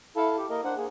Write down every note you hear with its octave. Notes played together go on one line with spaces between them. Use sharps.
E4 A4 F5 A5
G4
A#3 A#4 D#5
D4 C5 F#5
A#3 G#4